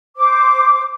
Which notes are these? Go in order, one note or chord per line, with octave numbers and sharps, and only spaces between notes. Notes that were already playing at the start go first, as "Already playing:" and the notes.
C5 D6